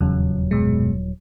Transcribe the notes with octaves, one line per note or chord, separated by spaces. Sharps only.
D#1 E2 C#3 F#3
F#2 B2 G#3